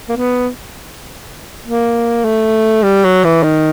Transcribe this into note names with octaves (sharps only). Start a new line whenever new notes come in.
A#3
B3
A#3
A3
G3
F#3
E3
D#3